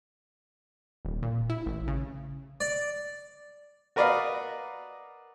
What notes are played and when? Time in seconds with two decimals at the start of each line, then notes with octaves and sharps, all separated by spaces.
1.05 D#1
1.23 A#2
1.50 E4
1.66 A1
1.88 C#3
2.60 D5
3.96 F#4 A#4 B4 D5 D#5 F5